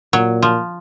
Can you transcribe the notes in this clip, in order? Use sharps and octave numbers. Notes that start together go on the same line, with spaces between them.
A#2 F#3
F3